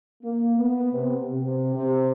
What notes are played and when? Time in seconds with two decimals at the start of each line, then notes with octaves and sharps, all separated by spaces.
0.23 A#3
0.57 B3
0.93 C3
1.28 C3
1.74 C3